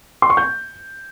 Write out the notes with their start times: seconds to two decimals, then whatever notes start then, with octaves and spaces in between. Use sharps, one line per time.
0.22 C6
0.30 C#6
0.37 G6